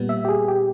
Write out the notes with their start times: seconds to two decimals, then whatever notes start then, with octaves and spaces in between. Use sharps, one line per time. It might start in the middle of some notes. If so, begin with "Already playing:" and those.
Already playing: A#2 G3 B3
0.09 E5
0.25 G4
0.29 G#4
0.48 G4